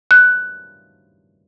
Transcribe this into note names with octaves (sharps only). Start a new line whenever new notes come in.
F#6